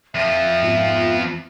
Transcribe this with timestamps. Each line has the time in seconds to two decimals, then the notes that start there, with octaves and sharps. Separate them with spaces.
0.15 F2 F3 E5
0.62 G#2 B3 F4